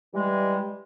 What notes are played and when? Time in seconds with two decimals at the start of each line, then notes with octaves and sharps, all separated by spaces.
0.14 E3 G3 G#3